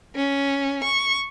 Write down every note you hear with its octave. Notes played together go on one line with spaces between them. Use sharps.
C#4
C#6